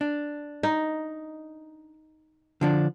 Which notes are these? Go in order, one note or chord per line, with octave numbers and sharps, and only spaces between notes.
D4
D#4
D3 F3 D4